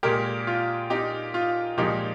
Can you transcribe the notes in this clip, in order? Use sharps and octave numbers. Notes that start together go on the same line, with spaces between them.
A#2 G#3 G4 A#4
F4
D#4 G4
F4
A#2 F3 G#3 D#4 G4